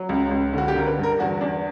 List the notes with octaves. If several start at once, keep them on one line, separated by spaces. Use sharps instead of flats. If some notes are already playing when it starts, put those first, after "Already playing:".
Already playing: F#3
C#2
C#2
D3 F#4
G4
D3 A#4
B4
G2
A#4
E2 F#4
E2 D4